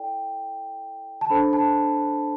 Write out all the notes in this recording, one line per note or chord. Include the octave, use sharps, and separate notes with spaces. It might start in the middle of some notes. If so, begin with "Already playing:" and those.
Already playing: E4 A4 D5 G5
A5
D4 A4 C5 B5
A5